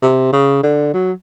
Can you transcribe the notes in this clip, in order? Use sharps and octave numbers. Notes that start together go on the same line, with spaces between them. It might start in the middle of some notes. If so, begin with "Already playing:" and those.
C3
C#3
D3
F#3